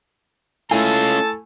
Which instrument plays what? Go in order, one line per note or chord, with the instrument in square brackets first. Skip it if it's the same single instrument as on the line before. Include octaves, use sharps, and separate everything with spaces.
[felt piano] A3 E4 G#5 [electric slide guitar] C#4 F4 [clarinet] A4 [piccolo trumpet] A5